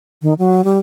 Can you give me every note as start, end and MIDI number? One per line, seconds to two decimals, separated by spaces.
0.22 0.34 51
0.39 0.64 54
0.64 0.79 55